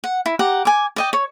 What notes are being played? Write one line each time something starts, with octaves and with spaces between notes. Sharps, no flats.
F#5
E4
G4 F#5 A#5
G#5 D6
D5 D#5 G5
C#5